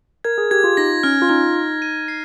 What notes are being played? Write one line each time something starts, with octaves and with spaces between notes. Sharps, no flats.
A#4 G#6
G#4
G4 G#6
F4
D#4 A#6
C#4 F6
F4
D#4 F6
F6
D#7
C7